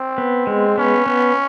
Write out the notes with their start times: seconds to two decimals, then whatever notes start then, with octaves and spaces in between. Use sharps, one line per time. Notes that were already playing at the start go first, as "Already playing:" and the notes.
Already playing: C4
0.18 B3
0.47 G#3
0.78 B3 C#4
1.06 B3